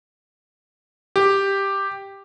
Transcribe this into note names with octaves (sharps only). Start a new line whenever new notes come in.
G4